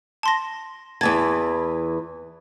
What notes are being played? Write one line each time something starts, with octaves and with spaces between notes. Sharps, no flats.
A5 C6 A#6
E2 E3 A5 G#6